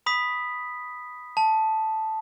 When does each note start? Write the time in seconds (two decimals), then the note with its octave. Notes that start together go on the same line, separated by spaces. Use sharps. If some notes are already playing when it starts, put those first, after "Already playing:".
0.06 B5 D#6 B6
1.37 A5